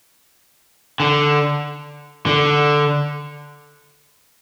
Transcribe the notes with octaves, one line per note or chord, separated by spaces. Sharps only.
D3
D3